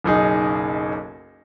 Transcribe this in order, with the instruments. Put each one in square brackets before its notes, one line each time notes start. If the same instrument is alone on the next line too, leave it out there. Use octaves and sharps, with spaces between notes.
[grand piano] F#1 B1 D#4 G#4